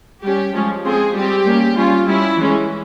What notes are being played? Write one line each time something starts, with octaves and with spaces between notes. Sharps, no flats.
G3 C#4 G4
F3 G#3 C#4
F3 G#3 C4 G#4
G3 C4 G4
G3 A#3 C#4
G3 C#4 F4
G3 C#4 E4
E3 G#3 C#4